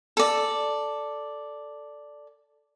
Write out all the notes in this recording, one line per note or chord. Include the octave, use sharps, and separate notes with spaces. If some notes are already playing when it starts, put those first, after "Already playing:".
A4 D5